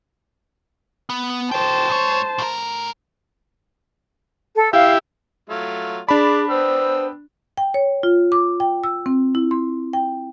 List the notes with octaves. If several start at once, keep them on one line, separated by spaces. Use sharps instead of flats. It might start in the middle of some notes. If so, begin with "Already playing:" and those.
B3
F#4 C5 G5 A5
G#2 C#5
A2 A#4
A4
E4 G4 F5
F#3 A3 F4
D4 G#4 D5 A5 B5 D6
B3 C5 G5 E6
G5
C#5
F4
D6
G5
E6
C4
E4
C6
G5